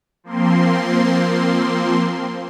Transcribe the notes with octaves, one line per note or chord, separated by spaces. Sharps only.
F3 A#3 C4 C6